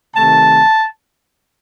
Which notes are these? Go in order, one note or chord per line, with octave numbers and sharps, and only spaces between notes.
C3 D#3 A3 A5